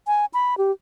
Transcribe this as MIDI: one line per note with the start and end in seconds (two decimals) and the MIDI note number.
0.07 0.26 80
0.34 0.57 83
0.58 0.72 67